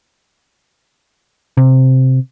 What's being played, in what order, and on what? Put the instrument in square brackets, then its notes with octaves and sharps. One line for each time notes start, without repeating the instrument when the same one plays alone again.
[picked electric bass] C3